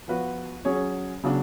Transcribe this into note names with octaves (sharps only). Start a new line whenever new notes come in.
F3 B3 F#4 B4
F#3 C#4 G#4 C#5
C#3 F#3 B3 D4